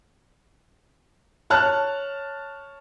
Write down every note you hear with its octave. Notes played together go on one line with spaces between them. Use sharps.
C#5 A5 F6 F#6